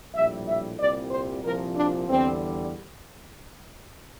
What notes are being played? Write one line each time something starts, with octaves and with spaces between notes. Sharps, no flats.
A#1 A2 G3 E5
E5
C2 A#2 G3 D5
C5
C2 A#2 F3 A#4
D4
E2 D3 G3 C4